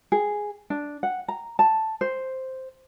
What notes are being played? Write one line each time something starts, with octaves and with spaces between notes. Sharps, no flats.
G#4
D4
F#5
A#5
A5
C5